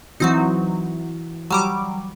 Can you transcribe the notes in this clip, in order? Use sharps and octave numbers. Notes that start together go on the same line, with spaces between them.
E3 F#3 C4 D#4 E4 F#4
F#3 G3 D6